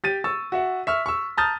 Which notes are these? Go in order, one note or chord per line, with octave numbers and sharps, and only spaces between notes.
G4 A6 D#7
C#6 E6 A6
F#4 E5 F#5
E5 C#6 F6
C#6 E6
A5 A#5 D#6 F6 G6 A6